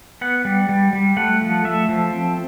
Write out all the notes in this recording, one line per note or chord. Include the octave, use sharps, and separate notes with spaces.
B3 F#5
G3
G3
G3
A3 F#5
F3
A3 E5
F3
C4